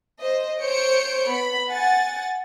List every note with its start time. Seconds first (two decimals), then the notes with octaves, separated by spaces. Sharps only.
0.19 C5 D#5
0.61 C5 C#5 G6 C#7 D7
1.27 B3 B5
1.68 F#5 G#5 A6